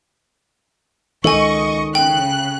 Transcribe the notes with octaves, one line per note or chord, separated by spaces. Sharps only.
C#2 D#3 A4 D#5 G#5 C#6
C#3 G5 F#6